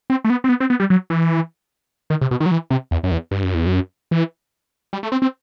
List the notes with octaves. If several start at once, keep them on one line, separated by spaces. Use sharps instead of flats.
C4
A3
B3
C4
B3
C4
B3
G3
F#3
E3
D#3
C3
B2
D#3
F#3
E3
C3
E2
F#2
E2
G2
F#2
E2
F#2
E3
G3
A3
C4
C4